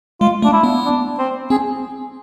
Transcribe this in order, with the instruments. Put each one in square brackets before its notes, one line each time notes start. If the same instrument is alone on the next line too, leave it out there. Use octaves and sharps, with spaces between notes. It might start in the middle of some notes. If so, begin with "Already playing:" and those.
[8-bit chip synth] G#3 [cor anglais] F4
[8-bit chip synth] A3 [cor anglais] D4
[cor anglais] E4
[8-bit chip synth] B3
[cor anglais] D4
C4
[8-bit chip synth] C4 [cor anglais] G#4